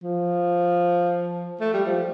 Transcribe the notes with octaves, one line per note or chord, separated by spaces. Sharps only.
F3
A3
G3
F3